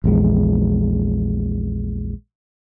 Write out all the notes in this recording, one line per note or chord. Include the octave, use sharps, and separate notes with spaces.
A#1 E2 G#3